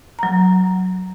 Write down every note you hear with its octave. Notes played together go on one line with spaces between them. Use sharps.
F#3 A#5